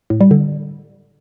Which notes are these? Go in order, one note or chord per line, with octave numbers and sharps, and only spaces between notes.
A2
G3
D3